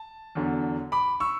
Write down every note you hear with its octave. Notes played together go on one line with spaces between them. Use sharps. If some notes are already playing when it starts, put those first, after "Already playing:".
Already playing: A5
E2 D3 F#3
B5 D6
C#6 E6